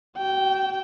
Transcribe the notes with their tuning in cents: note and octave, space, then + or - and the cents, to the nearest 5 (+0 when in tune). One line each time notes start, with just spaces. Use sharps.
F#4 +35 G5 -15